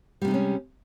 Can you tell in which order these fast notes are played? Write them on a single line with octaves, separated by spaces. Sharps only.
G3 C3 D#4 G#3 C#4